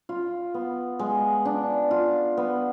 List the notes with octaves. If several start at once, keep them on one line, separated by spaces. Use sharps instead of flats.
F4
B3
G#3
D4
F4
B3